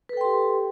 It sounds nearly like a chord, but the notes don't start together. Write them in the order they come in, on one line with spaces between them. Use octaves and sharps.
B4 A4 G5 C6 G4